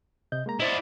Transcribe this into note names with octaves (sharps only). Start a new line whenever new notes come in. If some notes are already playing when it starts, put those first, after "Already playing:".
C3 D#5 G6
G#3 A#3 A#5
E4 C5 D5 D#5